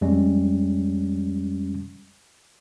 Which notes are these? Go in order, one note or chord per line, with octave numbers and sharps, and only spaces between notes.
F2 G3 G#3 C#4